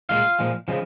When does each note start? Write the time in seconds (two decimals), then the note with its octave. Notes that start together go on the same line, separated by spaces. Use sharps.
0.09 A#2 G#3 F4 F5
0.39 A#2 F3 G#3
0.68 C#3 F3 G#3